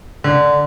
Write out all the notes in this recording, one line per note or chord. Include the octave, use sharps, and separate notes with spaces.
D3